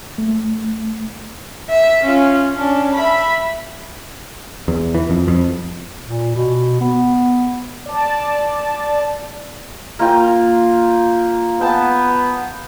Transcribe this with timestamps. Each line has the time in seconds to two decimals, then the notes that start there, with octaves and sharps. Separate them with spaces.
0.18 A3
1.69 E5
2.03 C#4 F4
2.53 C#4 D4
2.94 E5 B5
4.68 E2
4.95 E3
5.10 F2
5.28 F2
6.06 A#2
6.35 B2
6.80 B3
7.86 D5 A5
9.99 A#3 F4 G5
11.61 B3 G5 A5